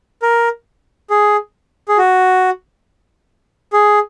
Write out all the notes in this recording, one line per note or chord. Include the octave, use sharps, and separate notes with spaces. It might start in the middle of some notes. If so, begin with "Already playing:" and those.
A#4
G#4
G#4
F#4
G#4